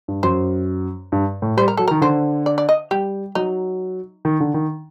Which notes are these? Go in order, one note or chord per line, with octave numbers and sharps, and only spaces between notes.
G2
F#2 C5
G2
A2
G3 C5
A#4
F#3 A4
D#3 A#4
D3 C5
D5
D5
D#5
G3 G4
F#3 D#4
D#3
D3
D#3